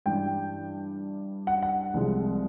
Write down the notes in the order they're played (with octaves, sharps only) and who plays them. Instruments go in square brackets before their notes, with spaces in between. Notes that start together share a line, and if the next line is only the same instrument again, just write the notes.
[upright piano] G2 E3 G3 G5
F#5
F#5
C2 C3 F3 G#3